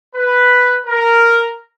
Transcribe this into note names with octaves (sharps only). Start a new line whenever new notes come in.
B4
A#4